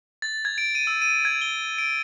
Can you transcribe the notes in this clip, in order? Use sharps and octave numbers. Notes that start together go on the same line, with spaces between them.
A6
G#6
D7
D#7
E6
D#7
G#6
G7
D7